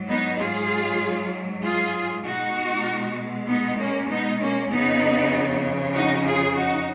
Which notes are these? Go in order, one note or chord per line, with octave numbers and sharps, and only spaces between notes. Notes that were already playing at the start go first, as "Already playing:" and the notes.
Already playing: G#2 F#3
B3 D#4
F4 G#4
F4 G#4
B2 G#3 D#4 F#4
B3 D#4
A#3 C#4
B3 D#4
A#3 C#4
F2 C#3 F3 B3 D#4
D#4 F#4
F4 G#4
D#4 F#4